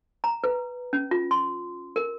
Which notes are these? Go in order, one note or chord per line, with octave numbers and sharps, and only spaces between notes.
A#5
B4
C#4
F4
C6
A#4